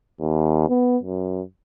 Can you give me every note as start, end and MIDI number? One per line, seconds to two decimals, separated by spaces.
0.19 0.65 39
0.69 0.97 59
1.03 1.41 42